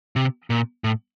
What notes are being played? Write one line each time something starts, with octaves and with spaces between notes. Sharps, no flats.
C3
A#2
A2